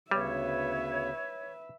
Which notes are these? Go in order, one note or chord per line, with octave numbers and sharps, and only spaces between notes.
D2 C#3 G3 B3 B4 C#5 E5